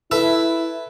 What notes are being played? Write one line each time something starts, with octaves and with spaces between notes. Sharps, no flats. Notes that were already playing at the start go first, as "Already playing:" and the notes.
E4 A4 B4 E5